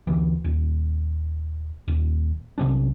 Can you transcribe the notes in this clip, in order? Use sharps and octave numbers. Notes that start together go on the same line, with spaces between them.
D2 E3
D#1
D#1
B1 C3 C#4 D4